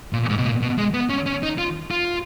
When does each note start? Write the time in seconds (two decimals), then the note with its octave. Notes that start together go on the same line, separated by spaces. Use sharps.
0.13 A#2
0.29 G#2
0.38 B2
0.45 A#2
0.62 B2
0.78 G#3
0.94 B3
1.10 C#4
1.26 C#4
1.43 D#4
1.58 F4
1.91 F4